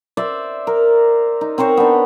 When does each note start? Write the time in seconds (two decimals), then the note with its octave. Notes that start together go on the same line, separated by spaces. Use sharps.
0.17 C5 D5 E5
0.67 A#4
1.41 D#4
1.58 C4 A#4 C5 C#5
1.77 B3 D4